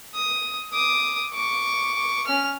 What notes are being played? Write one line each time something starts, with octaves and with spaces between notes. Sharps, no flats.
D#6
D6 D#6
C#6 D6
C#4 F6